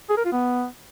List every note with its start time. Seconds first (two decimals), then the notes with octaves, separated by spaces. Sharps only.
0.10 G#4
0.17 A#4
0.25 F4
0.32 B3